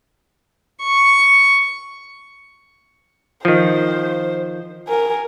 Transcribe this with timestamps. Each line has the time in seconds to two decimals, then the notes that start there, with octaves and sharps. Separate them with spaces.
0.83 C#6
3.45 D#3 F3 C5
4.87 A#4 G#5